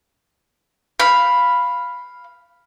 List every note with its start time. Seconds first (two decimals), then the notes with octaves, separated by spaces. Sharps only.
1.00 F5 B5